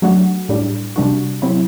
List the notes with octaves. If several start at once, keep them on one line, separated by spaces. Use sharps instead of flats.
F#3 A3 D4 F#4
A2 G3 D4
C3 G3 D4 F#4
C3 F#3 C4 E4